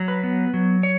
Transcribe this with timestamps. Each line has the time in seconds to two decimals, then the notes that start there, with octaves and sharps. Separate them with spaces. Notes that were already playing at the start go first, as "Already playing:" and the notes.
Already playing: F#3
0.08 B4
0.24 B3
0.54 F#3
0.83 C#5